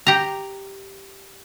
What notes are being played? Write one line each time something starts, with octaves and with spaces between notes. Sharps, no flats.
G4 A#5